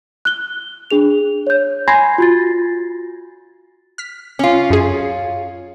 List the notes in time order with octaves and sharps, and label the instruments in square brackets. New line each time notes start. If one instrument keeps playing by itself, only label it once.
[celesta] F#6 G7
D4 G#4 F7
C#5 G6
G#5 B5 C6 G#6 A#6 C7
F4 F#4 A6
[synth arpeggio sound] F6 B6
[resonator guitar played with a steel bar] C#4 F4
[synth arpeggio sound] F#2 G#4